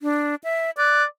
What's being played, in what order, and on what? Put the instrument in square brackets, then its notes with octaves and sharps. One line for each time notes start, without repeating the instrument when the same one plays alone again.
[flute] D4
E5
[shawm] D5 [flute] F#6